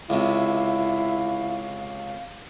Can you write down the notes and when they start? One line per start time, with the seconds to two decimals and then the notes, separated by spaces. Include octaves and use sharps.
0.10 C#2 C3 E4 F5